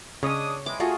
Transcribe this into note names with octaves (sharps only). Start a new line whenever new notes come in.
C#3 G#3 C#4 D4 C#5 D#6
E3 G3 G#3 D6
A3 F4 F#4 G#4